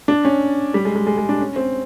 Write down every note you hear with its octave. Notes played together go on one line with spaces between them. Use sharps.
D4
C#4
G3
G#3
G#3
G#3
G#3
D4
C#4
C4